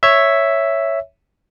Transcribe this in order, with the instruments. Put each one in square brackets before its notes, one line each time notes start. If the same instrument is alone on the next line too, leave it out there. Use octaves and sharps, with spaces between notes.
[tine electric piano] C#5 E5